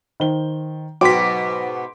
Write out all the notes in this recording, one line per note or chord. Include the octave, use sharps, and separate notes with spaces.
D#3 C5 G7
G#2 B2 F#3 B3 G5 C6 D6 B6